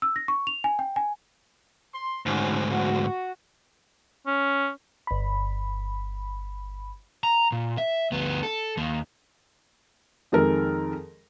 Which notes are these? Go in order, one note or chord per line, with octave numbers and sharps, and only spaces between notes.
E6
A#6
C#6
F7
G#5
G5
G#5
C6
D2 G#2 C#4 D#4 F#4
F#4
C#4
G1 B5
A#5
A#2
E5
D2 B3
A4
D#2 A#3
F2 D#3 G#3 A4 A#4